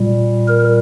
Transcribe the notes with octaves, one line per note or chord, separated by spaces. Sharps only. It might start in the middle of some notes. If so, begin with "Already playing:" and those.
Already playing: A#2 G3
A#4